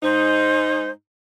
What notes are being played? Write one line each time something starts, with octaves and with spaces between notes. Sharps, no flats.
G#2 D#4 C5